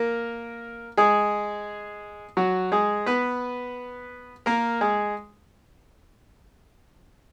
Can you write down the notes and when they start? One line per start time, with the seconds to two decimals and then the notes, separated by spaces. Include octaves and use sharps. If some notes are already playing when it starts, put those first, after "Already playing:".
Already playing: A#3 A#4
0.97 G#3 G#4
2.37 F#3 F#4
2.72 G#3 G#4
3.06 B3 B4
4.46 A#3 A#4
4.81 G#3 G#4